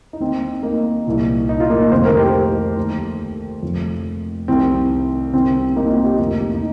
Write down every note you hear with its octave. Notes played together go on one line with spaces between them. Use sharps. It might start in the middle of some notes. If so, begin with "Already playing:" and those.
D#4
D#2 D#3 C4
A#3 D#4
C2 A#2 F3
D#4
F4
A#3 D#4
F1 F2 C3 D#3 C5
A#4
G4 C5
D#2 D#3
F1 F2 F3
C2 C3 D#3 C4
C2 C3 D#3 C4
A#3 D#4
C4 F4
D#4 G4
F1 F2 F3 A#3 D#4
D#4